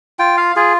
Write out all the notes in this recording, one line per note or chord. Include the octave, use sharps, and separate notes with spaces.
F4 G5
F5
F4 G#4